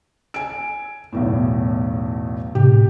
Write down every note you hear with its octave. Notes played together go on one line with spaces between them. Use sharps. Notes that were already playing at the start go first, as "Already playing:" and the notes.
G#5 D7
B1 E2 A2
A2 C3 G4